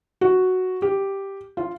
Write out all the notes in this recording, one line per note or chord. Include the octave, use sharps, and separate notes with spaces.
F#4
G4
F4